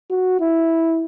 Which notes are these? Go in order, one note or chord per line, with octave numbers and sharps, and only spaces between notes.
F#4
E4